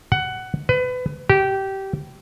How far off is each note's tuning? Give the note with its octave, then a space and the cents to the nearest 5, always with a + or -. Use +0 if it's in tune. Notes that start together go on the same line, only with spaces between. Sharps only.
F#5 +15
B4 +30
G4 -20